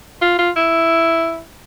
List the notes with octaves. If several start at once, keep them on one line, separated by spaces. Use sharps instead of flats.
F4
F4
E4